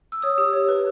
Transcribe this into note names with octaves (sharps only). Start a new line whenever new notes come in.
E6
C#5 D#6
G4
C#5
B4